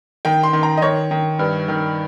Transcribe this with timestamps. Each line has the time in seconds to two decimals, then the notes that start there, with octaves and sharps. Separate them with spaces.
0.25 D#3 G5
0.43 C6
0.53 D#3
0.63 A#5
0.77 D#5
0.82 D#3 C#5
1.11 D#3
1.39 G2
1.68 D#3